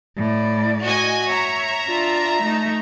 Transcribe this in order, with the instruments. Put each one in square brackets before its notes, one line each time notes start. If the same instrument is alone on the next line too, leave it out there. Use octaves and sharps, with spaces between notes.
[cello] A2 D5
[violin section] F#4 D#5 G#5
[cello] C#5 [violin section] E5 A#5
[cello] D4 F4
A3 D#4